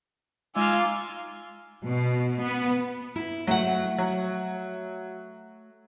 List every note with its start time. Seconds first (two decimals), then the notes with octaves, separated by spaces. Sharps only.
0.56 G#3 D#4 F4 F5 G#5 D6 E6
1.84 B2
2.40 B3
3.16 E4
3.47 F#3 A3 F#5
3.98 F#3